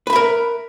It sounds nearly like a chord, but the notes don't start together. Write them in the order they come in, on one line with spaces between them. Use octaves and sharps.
B4 B5 E5 A#4